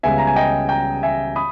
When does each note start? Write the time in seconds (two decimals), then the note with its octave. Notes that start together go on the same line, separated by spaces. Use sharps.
0.03 C#2 C#3 G3 B3 E5 G#5
0.18 A#5
0.27 G#5
0.36 D#5 G5
0.69 G5 A#5
1.03 E5 G#5
1.36 B5 D#6